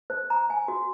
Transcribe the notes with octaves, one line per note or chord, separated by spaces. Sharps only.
C5
A#5
G#5
F#4